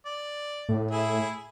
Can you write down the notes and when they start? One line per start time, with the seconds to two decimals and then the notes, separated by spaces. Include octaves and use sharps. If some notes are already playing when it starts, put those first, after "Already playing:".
0.06 D5
0.69 A2
0.91 E4 G#4 E5